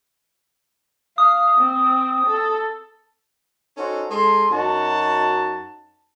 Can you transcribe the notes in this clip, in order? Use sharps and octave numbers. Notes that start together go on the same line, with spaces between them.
F5 D#6
C4
A4
C#4 D#4 F#4 A4 C5
G#3 A4 C6
F#2 D#4 F#4 A5